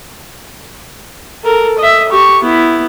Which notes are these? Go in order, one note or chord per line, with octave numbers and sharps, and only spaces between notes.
A4 A#4
D#5 E5
G4 C#6
B3 E4